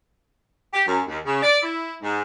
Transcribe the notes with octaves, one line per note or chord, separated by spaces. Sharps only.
G4
F#2
D#2
C#3
D5
E4
G#2